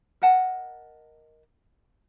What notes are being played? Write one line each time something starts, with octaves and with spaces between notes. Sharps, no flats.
A#4 D#5 F#5 A5